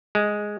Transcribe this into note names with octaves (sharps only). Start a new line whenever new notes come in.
G#3